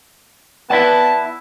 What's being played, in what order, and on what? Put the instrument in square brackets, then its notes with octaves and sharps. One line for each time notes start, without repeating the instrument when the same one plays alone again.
[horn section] B3 A5 [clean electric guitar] E4 D5 F#5